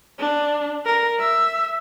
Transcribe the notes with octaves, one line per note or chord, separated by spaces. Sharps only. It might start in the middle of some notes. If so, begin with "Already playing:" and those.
D4
A#4
E5